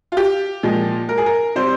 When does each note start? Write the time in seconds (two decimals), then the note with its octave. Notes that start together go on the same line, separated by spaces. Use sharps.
0.12 F4
0.17 G4
0.63 A#2 F3 G#3
1.09 A#4
1.18 G#4
1.26 A#4
1.56 C3 G3 C5